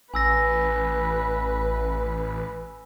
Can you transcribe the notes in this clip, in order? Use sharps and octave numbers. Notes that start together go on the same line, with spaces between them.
A1 B4 G#5 E6 A#6